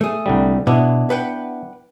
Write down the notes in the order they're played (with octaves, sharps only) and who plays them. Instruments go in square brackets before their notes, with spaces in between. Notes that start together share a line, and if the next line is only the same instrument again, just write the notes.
[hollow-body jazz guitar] A3 G#4
[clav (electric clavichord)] C2 D3 G3
[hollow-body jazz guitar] B2 [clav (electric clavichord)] B3 D4 E4
[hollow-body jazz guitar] B4 F#5 G5